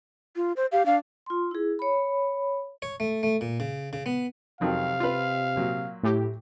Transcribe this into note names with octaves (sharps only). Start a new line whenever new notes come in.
F4
C5
G4 F5
D4 F5
F4 C6
E4 G#4
C#5 B5
C#5
A3
A3
A#2
C#3
C#3
B3
F2 C3 D#3 F#3 F5
F4 B4
A#2 F#3
A2 G4